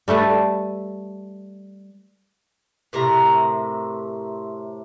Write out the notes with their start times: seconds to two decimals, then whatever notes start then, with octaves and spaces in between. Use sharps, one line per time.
0.08 G3 A3 A4 B4
2.93 A2 C3 A#4 A#5